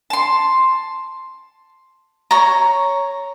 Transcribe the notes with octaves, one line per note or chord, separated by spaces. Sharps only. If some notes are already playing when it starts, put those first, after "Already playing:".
A5 C6
C#5 A#5